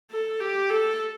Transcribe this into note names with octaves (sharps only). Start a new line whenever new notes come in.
A4
G4
A4